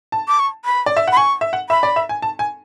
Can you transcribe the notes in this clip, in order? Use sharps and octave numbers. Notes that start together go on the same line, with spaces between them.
A5
D6
C#6
B5
D5
E5
F#5 B5
G#5 C#6
E5
F#5
E5 B5
D5
E5
G#5
A5
G#5